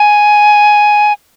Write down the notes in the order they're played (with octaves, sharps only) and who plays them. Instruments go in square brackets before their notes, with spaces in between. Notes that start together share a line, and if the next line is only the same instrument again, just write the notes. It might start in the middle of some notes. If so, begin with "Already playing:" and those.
Already playing: [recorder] G#5